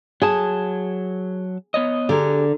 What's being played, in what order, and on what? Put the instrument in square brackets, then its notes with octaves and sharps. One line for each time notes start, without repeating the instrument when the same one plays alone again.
[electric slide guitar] F#3 A5 [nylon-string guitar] G#4
[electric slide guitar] B3 C#5 D#5
[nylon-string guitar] D3 A#4 [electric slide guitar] G4 G#4